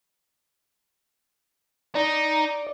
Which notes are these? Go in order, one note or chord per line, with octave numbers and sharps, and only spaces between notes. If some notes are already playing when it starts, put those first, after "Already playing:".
D#4 D5